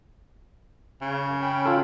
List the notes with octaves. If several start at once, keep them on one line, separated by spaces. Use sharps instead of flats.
C#3
F#2
C#4 G5 B5
F4 A4